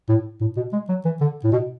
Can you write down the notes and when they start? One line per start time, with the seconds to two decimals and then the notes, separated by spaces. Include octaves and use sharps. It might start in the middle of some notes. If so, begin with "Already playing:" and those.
0.09 A2
0.41 A2
0.57 B2
0.73 G#3
0.89 F#3
1.05 E3
1.21 D3
1.44 A2
1.52 B2